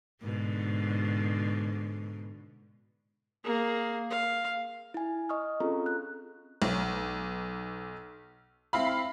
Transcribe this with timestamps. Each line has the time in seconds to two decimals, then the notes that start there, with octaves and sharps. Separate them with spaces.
0.23 G#2 B2 D3
3.44 A#3 G#4
4.10 F5
4.94 E4 G#5
5.29 D#5 C#6 D#6 F6
5.60 C4 C#4 F4 G#4 A4 A#5
5.86 F#6
6.62 B1
8.73 C4 E4 F5 B5